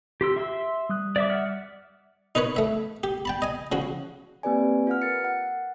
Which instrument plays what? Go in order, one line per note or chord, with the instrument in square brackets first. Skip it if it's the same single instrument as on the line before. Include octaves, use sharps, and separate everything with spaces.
[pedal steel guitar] G4 C6 E6
E5 C6 E6
[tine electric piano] G3 D#6 F#6
[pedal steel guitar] D5 E5 D6
E5 F#5 F6
[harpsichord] D#4 A#4 B4 C#5 B5
A3 E5
G4
G5 A5 B5
D#5 G#5
C#3 F3 F#4
[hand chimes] A#3 C4 G4 B4 D5 G#5
F4 B4 F#5 F6
A#4 A6 C#7
F#5